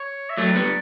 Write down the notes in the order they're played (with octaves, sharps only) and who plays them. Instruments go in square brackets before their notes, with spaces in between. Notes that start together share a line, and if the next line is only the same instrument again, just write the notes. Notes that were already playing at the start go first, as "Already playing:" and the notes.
Already playing: [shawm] C#5
E5
[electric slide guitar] F#3 A3 [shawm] D5
[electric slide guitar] G3 B3